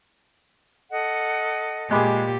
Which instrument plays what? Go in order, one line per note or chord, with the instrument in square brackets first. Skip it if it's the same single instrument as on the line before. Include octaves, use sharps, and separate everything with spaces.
[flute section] A4 D#5 F#5
[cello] A#2 G4 [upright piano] G#3 G#4 [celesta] D#5 B5 D6